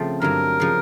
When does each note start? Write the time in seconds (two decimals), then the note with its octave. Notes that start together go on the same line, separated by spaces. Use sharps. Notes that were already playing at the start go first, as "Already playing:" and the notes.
Already playing: C#3 F3 A3 C4
0.22 G2 D3 F#3 A#4
0.60 C#3 F3